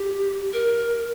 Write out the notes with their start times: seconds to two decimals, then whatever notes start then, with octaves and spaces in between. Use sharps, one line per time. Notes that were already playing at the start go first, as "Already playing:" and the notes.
Already playing: G4
0.53 A#4